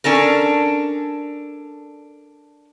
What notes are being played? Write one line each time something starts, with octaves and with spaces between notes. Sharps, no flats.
C#4 D4 A4 A#4